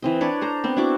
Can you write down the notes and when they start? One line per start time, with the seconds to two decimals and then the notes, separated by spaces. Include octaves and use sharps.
0.02 E3 C4 D#5
0.21 D4 B4 C#5 D5
0.41 A4 C5 A#5
0.64 B3 C4
0.77 D4 E4 F#4 D6